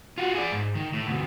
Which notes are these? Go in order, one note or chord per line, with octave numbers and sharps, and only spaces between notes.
F4 F#4
G#4 D5
G#2
D#3
A2
D2 B2